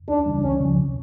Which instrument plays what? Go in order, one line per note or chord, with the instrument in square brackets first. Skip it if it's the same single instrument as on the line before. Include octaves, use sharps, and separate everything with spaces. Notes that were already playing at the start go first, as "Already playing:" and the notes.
[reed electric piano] D2 [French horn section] D4
[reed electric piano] C#3 E3 G3
[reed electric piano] C#2 [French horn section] C#4
[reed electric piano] C#3 F3
C3